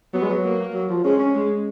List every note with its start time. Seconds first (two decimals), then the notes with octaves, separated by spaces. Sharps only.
0.14 F#3 B3
0.22 G#3
0.30 F#3
0.44 A#3
0.74 F#3
0.89 F3
1.04 G#3 C#4
1.19 C#4
1.34 G#3